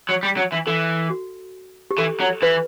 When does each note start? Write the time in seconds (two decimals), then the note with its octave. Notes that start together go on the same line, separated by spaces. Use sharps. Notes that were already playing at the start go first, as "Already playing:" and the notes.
0.09 F#3
0.23 G3
0.37 F#3
0.52 E3
0.67 E3 A4
1.10 F#4
1.91 G4
1.98 E3 A4
2.20 F#3
2.42 E3 B4